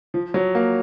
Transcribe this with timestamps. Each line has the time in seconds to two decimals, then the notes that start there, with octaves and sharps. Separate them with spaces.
0.14 F3
0.34 F#3
0.55 A#3